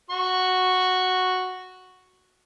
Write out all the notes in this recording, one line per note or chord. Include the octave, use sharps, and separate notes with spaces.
F#4 C#6